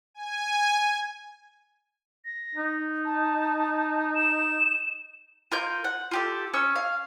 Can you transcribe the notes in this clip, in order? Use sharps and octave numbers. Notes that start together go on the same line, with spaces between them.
G#5
A#6
D#4
A5
E7
F4 A#4 G6
F#5
F4 G4 A4
C#4 C#6 E6
F5